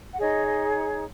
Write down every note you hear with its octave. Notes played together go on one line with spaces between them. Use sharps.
F#5
D#4 G#4 C#5 D#5
D#5